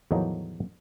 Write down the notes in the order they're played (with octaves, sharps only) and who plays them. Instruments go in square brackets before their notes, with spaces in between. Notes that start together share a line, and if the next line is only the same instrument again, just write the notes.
[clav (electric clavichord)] E2 A2 D#3 F3 F#3 D#4